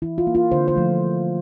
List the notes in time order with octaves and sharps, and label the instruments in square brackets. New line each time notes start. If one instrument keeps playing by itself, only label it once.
[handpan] E3 E4
F4
A#3
F4
D3 C5
C5
F3 A3